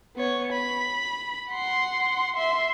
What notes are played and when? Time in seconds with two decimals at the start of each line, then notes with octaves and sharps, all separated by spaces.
0.17 B3 C#5
0.53 B5
1.52 F#5 C6
2.36 E5 C6